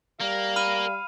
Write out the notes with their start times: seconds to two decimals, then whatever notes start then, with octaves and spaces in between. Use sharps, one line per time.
0.20 G3 A#3 F5
0.56 B5 F6 D#7